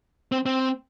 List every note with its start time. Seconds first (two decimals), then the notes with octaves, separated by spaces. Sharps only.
0.32 C4
0.46 C4